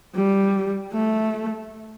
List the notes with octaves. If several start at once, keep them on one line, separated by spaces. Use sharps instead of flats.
G3
A3